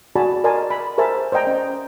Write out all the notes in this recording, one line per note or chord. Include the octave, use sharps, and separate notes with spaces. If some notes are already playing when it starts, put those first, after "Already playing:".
F#4 G#4 D5 G#5 A5 B5
A#4 D5 D#5 G#5 A5 C6
B5
G#4 A#4 C5 E5 G#5 A5
C5 D5 D#5 G5 A#5
C#4